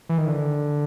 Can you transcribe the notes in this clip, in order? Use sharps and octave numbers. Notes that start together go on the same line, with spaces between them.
E3
D#3
D3